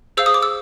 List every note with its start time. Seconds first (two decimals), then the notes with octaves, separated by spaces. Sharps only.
0.17 G#4 C5 F5 E6
0.26 D#6
0.34 D6
0.42 E6